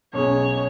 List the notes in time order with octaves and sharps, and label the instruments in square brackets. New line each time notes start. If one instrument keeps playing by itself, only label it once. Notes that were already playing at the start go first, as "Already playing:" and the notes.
[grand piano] B1 B2 G#3 C#4 G#4 [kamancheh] C#5